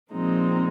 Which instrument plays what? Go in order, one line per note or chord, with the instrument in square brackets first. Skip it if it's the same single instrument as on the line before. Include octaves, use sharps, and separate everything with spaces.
[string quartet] A#2 F3 G#3 C4 D#4